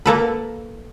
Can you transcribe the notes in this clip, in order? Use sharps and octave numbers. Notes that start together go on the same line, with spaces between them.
A#3 A4 B4